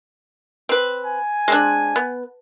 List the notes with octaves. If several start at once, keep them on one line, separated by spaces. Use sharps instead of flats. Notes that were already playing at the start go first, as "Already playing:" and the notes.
C4 B4
G#5
G#3 C4 D4
B3